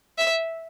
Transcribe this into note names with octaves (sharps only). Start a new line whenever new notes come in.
E5